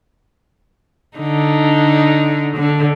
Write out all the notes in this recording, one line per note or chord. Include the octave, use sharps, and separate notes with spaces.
D3 D#4
D3